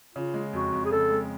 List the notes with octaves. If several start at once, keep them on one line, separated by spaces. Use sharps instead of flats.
C#3 F4
G#3
F2 F#4
F2
G#4
C#3 A4
G#3